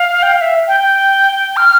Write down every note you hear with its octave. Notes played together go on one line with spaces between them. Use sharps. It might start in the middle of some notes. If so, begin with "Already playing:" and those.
Already playing: F5
G5
F5
E5
G5
G5
F6